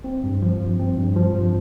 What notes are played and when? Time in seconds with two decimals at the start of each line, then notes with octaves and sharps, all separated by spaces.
0.04 C4
0.24 G2
0.42 F3
0.60 G2
0.80 C4
0.98 G2
1.16 F3
1.35 G2